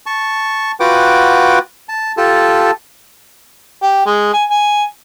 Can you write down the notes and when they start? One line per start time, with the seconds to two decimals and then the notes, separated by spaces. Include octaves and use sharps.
0.06 A5 C#6
0.80 F4 F#4 B4 F#5 G5 D6
1.89 A5
2.17 F4 G4 A4 A5
3.82 G4
4.06 G#3
4.34 G#5
4.50 G#5